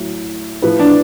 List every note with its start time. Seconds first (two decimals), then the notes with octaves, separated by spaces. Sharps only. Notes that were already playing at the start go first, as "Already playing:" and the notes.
Already playing: A2 F#3
0.62 A2 F3 B4
0.79 D4